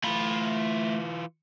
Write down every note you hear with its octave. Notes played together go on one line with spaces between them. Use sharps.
E3 A3 F4 B5